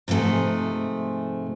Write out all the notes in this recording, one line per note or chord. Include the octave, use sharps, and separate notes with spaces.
G#2 C3 F3 A3 G#4